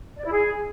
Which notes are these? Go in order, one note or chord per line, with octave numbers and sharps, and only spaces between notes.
D5
E4
G#4